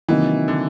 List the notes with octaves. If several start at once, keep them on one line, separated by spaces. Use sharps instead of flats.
C3 D#3 E3 F#3 A#3
D3